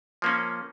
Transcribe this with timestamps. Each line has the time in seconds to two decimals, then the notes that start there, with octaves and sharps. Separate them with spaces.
0.22 F3 A#3 C#4